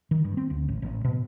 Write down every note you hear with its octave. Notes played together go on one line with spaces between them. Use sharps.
D#3
G2
C4
D2
A1
A1
B2